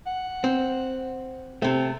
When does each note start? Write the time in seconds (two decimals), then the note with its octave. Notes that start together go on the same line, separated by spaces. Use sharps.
0.06 F#5
0.44 C4
1.62 C3 A3 C4